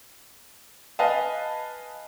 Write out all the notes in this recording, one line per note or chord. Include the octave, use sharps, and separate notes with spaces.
B4 D#5 F5 G#5 A5